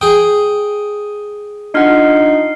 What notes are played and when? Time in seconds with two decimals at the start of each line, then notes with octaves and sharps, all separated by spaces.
0.01 G#4 G5 D#6
1.74 D4 D#4 F4 F#5 F6 C7